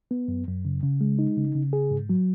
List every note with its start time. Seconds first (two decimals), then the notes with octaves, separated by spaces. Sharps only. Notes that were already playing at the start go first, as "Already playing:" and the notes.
0.11 B3
0.28 F#2
0.47 F#2
0.65 C#3
0.83 C#3
1.01 G#3
1.19 D#4
1.37 C#3
1.55 C#3
1.73 G#4
1.91 G#2
2.09 F#3